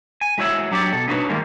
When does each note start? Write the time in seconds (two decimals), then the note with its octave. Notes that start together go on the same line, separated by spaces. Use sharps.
0.21 G#5
0.38 G#3 E4 F#4 C#5 E5 F#5
0.71 F#3 D4 G4 C#5 D5
0.92 B2 A4
1.08 B3 D4 D#4 F#4 B4 C#5
1.29 D#3 G3 G#3 A#3